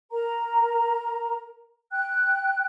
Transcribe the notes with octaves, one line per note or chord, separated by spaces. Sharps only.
A#4 A#5
G5 F#6